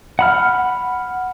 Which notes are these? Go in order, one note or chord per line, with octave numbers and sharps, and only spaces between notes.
F#5 B5 F6